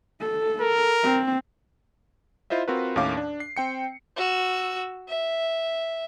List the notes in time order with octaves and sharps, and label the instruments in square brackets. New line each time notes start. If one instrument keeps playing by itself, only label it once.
[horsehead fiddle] A4
[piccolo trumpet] A#4
[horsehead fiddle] C4
[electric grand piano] E4 F4 C5 D#5 E5
C4 F4 F#4 A#4 B4
D#2 A2 D#3 C#4 F5 D6
D4
C7
C4 G5 C#7
[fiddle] F#4 E6
E5